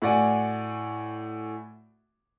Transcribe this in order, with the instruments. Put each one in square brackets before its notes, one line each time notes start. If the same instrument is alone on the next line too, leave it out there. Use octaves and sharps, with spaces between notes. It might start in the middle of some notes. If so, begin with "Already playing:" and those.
[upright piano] A2 F#4 D5 F#5 G#5